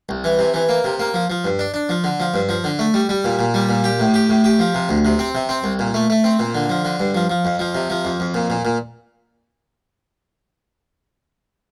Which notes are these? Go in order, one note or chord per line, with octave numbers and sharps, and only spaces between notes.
C2
E3
C3
E3
A#3
C3
A#3
F3
F3
G2
D4
D4
F3
D3
F3
G2
F3
D3
A3
G3
G3
A#2
A#2
G3
A#2
G4
A2
G4
A2
G4
F3
C3
D2
C3
C4
C3
C4
C2
A#2
A3
A3
C4
A#2
D3
F3
D3
G2
F3
F3
F2
F3
C3
F3
F2
F2
A#2
A#2
A#2